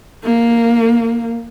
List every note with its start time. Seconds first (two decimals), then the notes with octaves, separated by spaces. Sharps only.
0.24 A#3